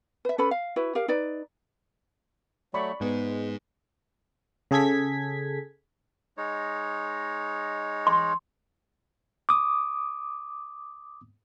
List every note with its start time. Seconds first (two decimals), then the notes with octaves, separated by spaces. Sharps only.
0.25 B4 E5
0.38 C#4 A4 B4 B5
0.51 F5
0.76 E4 F#4 B4
0.95 G4 A#4 F5
1.08 D#4 B4 D5
2.74 F#3 A3 D5 B5 C#6
3.01 G#2 G#3 B3
4.71 C#3 G#4 A4 G#6 B6
6.37 G#3 D#4 C#5
8.07 C6
9.49 D6 D#6